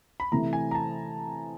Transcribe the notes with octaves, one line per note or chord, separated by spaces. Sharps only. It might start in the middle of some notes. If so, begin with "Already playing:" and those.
B5
C3 E3 A3 A#5
G#5
A#5
A5